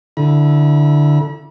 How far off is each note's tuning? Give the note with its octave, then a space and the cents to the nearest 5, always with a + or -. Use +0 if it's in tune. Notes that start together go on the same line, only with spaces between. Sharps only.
D3 +0 E4 +0 B5 -45